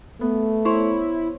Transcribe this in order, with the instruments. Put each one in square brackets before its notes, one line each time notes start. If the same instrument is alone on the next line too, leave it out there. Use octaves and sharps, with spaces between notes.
[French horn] A3 [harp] B3
[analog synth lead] E4 [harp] C5 C#5 C#6